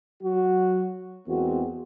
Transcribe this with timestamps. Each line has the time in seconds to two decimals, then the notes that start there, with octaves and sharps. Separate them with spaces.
0.22 F#3 F#4
1.27 E2 G#3 A#3 C4 F#4